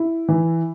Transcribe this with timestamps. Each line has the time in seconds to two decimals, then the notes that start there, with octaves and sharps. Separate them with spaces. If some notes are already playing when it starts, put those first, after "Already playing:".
Already playing: E4
0.28 E3